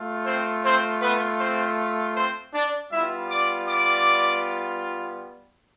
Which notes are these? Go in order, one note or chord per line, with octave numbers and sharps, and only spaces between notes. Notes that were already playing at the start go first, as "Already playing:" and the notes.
Already playing: A3 F4
C4 C5
C4 C5
B3 B4
C4 C5
C4 C5
D4 D5
G3 B3 E4 F4 E5
D5 D6
D5 D6